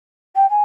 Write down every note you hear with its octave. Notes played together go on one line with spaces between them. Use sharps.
G5
G#5